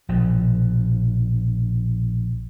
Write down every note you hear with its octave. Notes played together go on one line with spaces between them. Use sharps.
A#1 B2 F3